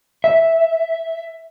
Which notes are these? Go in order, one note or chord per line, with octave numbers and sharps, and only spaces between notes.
E5